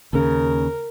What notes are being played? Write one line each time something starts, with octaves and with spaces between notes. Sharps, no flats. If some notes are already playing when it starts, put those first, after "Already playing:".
D#2 C#3 A#4